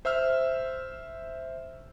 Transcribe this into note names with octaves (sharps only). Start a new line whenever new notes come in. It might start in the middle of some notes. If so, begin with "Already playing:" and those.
C5 E5 E6 F6